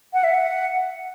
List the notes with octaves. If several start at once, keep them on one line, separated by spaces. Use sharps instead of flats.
F#5
E5
F#5